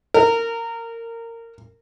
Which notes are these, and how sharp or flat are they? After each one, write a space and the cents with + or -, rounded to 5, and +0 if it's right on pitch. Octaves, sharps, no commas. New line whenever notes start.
A#4 -20